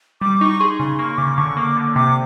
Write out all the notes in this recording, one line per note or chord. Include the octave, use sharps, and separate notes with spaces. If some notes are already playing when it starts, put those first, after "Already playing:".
G3 D6
D#4 C#6
G#4 C6
C#3 C6
A#3 C#6
C#3 D6
D3 C#6
A#3 D6
D3
C3 D6